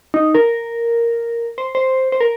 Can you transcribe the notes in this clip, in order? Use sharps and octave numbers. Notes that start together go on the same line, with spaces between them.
D#4
A#4
C5
C5
C5
A#4